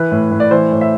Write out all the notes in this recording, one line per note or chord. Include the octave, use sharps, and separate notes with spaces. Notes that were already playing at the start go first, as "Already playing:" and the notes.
Already playing: E3 B4
A2
A2
D5
E3 C5
A2
E5